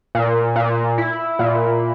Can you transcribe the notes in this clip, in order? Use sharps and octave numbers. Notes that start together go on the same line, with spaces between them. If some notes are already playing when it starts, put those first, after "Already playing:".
A#2
A#2
E4
A#2